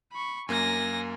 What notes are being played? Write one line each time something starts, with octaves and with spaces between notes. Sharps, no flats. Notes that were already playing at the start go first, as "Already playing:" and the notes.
B5 C#6
F#2 A#3 G#5 A#6